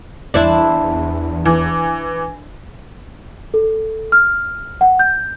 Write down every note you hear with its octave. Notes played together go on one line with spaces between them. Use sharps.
E2 D4 E4 C5 A5
E3
A4
F6
F#5
G6